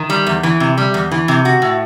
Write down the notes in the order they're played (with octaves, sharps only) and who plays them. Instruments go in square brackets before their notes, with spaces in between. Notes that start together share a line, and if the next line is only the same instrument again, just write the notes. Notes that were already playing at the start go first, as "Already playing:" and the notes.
Already playing: [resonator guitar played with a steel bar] D#3
G3
E2
E3
C3
G3
E2
E3
C3
F#4
A2